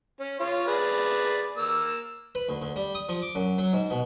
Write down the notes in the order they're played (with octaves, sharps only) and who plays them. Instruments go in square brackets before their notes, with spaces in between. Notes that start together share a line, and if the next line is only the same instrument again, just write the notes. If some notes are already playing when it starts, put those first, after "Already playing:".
[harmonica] C#4
F4 C#5
G#4 B4 D5
A#3 E6
[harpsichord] B4
D2
D2
G3
D#6
F3
D6
F#2
F#3
G#2
B2